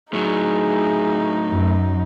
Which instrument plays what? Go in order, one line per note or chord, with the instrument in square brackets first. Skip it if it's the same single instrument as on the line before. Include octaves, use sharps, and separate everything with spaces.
[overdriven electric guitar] A2 F#3 [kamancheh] D#4 [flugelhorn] G#4
[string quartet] F#2